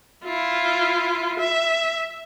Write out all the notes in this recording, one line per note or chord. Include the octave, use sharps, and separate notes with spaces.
E4 F4
E5